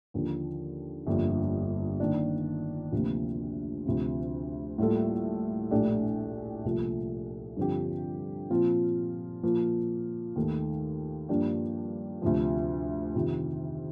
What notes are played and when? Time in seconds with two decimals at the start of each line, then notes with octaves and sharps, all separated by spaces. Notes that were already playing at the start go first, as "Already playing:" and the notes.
0.14 D#2 D3 F3
1.07 G1 F2 D3 G3 A#3
2.00 D#3 A#3 D4
2.92 D2 C3 F3 A#3 F4
3.86 D2 C3 F3 C4 F4
4.78 A2 G3 A#3 F4 A4
5.71 A#1 A2 A3 D4 G4
6.65 C2 A#2 F3 A3
7.57 G2 D3 F3 C4 G4
8.50 A#2 F3 C4 F4
9.43 A#2 F3 A#3
10.36 D#2 D#3 A3
11.29 G2 F3 A#3 D4 G4
12.22 D2 C3 F3
13.15 F2 C3 D#3